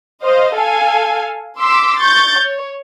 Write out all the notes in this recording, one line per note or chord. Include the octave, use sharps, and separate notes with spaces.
C5 D#5 F5
A4 F5 G#5
C6 D6 E6 B6
C#6 G6 A6
C#5